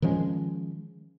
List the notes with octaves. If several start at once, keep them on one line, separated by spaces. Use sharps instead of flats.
D#3 F3 G#3 C#4